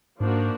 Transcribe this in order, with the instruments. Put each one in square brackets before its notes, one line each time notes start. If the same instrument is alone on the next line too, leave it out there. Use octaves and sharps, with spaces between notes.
[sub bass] G#2 [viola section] F3 A#3 D4 F#4